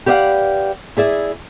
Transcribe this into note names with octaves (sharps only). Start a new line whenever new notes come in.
G4 B4 D5 D#5 F5 F#5
E4 G#4 D5 E5